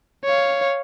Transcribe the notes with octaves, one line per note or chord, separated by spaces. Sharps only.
C#5 F5